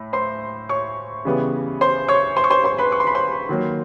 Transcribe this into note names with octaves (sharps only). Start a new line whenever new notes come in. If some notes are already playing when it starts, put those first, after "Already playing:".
Already playing: A2
C5 C6
C#5 C#6
C#3 E3 G3 B3
C5 C6
C#5 C#6
C5 C6
C#6
C5 C6
C5 C6
B4 B5
C#6
C6
B5
C5 C6
D#3 F#3 A#3